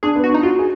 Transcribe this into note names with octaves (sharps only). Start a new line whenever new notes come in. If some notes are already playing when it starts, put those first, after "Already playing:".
D4 G#4
B3
F#4
D4 D#4
F4 F#4
G#4